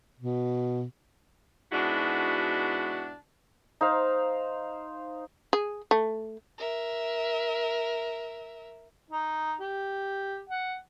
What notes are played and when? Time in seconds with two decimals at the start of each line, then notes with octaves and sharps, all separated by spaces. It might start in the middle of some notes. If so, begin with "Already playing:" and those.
0.19 B2
1.72 G#2 B2 D4 E4 F#4
3.81 D#4 C5 F5
5.53 G#4
5.91 A3
6.58 A#4 E5
9.11 D#4
9.60 G4
10.50 F#5